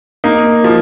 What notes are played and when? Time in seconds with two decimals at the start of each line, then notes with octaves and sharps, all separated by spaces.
0.24 A#3 D#4
0.64 F3